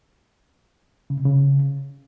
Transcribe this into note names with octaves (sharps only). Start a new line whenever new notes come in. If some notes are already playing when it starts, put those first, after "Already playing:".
C#3
C3
C#3